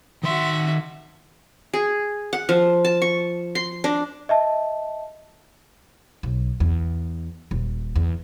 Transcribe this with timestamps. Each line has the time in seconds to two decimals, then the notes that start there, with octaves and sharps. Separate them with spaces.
0.23 D#3 F#4 E5 C6
1.73 G#4
2.33 F#5
2.49 F3
2.85 A5
3.02 C#6
3.55 C6
3.84 D4
4.29 D#5 E5 A5
6.23 B1
6.60 E2
7.51 D#1
7.95 E2